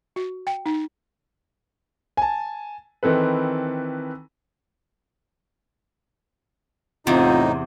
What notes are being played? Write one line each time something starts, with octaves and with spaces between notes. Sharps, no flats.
F#4
G5
D#4
G#5 A5
D#3 E3 C4 A4 B4
E2 A2 C3 C4 D#4 F4